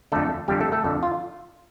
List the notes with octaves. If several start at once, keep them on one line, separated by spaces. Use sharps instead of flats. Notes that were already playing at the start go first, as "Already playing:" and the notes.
F2 D3 A3 A4
F2 D3 G3 G4
A3 A4
A3 A4
F2 D3
F4